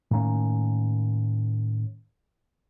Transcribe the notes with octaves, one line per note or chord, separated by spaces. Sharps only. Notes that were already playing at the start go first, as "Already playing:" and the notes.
A2 D#3 A#3 C#4